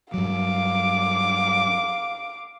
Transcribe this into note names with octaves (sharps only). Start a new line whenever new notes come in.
G2 F#3 F5 D6